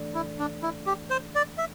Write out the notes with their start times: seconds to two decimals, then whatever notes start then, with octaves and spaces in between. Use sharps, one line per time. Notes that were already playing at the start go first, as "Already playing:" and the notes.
Already playing: E3 A3 D4 A4 D5
0.14 E4
0.39 D4
0.63 E4
0.86 G4
1.10 C5
1.35 D5
1.58 E5